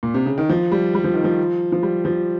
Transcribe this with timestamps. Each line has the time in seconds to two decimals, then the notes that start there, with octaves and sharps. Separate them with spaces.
0.03 A#2
0.14 C3
0.26 C#3
0.38 D#3
0.49 F3
0.72 G3
0.94 G3
1.04 F3
1.14 D#3
1.24 F3
1.72 F3
1.83 G3
2.05 F3